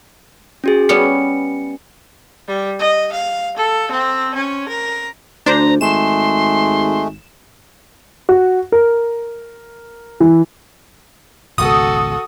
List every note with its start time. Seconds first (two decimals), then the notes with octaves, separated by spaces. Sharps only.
0.64 C#4 F#4 G#4
0.89 G3 B3 C#4 C#7
2.48 G3
2.79 D#5
3.12 F5
3.57 A4
3.91 C4
4.34 C#4
4.68 A#4
5.46 D2 D4 C5 A#5
5.81 G#1 G#3 A3 C6 E7
8.29 F#4
8.72 A#4
10.20 E3
11.58 G#1 C#2 B2 F#4 A4 D#6